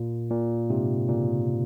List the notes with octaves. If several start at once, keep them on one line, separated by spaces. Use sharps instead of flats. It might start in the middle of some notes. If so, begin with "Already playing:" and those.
Already playing: A#2
A#2
G#2 C3
A#2 C#3